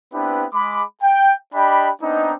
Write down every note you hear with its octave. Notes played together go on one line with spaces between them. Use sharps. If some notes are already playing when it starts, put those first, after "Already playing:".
B3 C4 D4 E4 G4 B4
G#3 B5 D6
G5
D4 G4 D#5 G5 B5
B3 C4 D4 D#4